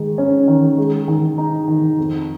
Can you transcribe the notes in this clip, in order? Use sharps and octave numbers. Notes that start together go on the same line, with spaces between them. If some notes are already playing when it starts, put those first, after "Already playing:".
Already playing: D#3 G#3
C#4
D#3
G#3
D#3
D#4
D#3
F2